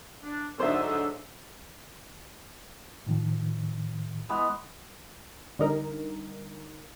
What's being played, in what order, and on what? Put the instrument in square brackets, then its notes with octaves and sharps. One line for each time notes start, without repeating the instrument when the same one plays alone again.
[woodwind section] D4
[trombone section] G#2 F#3 [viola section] D3 D#4 [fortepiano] C5 E5 [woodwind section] E6
[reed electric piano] A2 D#3 F3
[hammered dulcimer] E3 G#3 B3
[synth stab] D3 G3 D#4 A#4